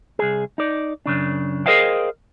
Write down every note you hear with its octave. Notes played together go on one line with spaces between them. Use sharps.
C2 G#4
D#4 D5
F#2 C#3 D4
G#4 A#4 C5 D#5 F5 G5